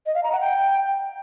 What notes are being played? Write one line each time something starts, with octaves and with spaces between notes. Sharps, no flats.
D#5
F5
A#5
F#5
G5